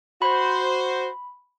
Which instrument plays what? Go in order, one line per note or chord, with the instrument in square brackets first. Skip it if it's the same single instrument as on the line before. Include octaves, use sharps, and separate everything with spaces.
[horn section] F#4 C5 [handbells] B5